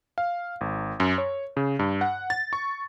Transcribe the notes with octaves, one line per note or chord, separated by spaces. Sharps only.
F5
G#1
F#2
C#5
C#3
G2
F#5
A6
C#6